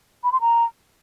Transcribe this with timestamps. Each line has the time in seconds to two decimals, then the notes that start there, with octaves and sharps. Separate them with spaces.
0.24 B5
0.32 C6
0.41 A#5